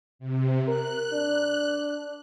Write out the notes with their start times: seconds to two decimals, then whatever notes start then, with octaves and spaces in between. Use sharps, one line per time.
0.19 C3
0.68 A#4 F#6
1.13 D4